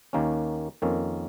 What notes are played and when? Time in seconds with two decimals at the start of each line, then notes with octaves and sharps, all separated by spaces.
0.13 D#2 D#3 A#3 C#4
0.82 F2 D#3 A#3 C#4